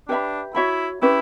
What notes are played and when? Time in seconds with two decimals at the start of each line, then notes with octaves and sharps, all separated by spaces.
0.08 D4 G4 B4 E5 B5
0.55 E4 F#4 C#5 E5 B5
1.02 C#4 E4 G4 B4